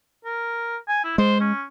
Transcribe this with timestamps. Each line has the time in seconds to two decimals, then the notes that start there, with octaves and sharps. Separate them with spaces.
0.25 A#4
0.88 G#5
1.04 E4
1.18 G#3 C5
1.41 C#4